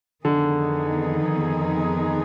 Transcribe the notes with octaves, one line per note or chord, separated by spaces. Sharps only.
F2 D3 D#3 B3 D#4 G#4